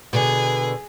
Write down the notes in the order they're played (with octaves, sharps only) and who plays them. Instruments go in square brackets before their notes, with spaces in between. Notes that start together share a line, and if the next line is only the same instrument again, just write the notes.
[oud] B2 D3 [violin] G#4